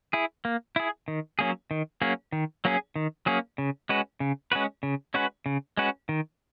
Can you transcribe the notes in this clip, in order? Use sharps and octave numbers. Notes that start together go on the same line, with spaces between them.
E4 G#4
A#3
E4 G#4
D#3
F#3 A#3 C#4 G#4
D#3
F#3 A#3 C#4 G#4
D#3
F#3 A#3 C#4 G#4
D#3
F#3 A#3 C#4 G#4
C#3
G#3 C#4 F#4 B4
C#3
G#3 C#4 F#4 B4
C#3
G#3 C#4 F#4 B4
C#3
G#3 C#4 F#4 B4
D#3